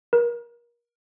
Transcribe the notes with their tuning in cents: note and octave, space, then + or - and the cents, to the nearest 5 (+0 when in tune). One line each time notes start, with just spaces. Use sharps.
A#4 +30